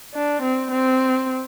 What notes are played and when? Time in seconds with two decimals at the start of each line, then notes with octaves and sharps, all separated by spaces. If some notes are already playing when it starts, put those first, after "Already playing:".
0.14 D4
0.42 C4
0.72 C4